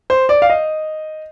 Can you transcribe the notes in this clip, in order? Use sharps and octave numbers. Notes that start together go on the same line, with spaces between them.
C5
D5
F5
D#5